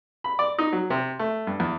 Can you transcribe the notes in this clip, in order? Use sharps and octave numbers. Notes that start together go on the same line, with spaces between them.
B5
D5
D#4
F#3
C3
A3
G2
E2